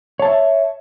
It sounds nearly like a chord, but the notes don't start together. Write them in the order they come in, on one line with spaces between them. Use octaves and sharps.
C#5 A5 E5